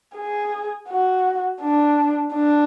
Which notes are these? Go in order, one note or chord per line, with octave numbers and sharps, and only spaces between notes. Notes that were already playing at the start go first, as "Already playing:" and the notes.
G#4
F#4
D4
D4